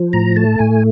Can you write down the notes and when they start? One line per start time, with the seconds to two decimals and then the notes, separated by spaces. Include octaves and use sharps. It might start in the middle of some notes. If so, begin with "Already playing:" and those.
Already playing: F3
0.13 A2 A#5
0.36 A3 A5
0.59 A2 G#5